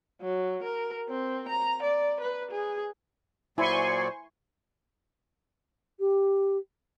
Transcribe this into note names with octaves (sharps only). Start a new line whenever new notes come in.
F#3
A#4
C4
A#5
D5
B4
G#4
A#2 F#3 E4 C5 D5 G#5 C6 C#6
G4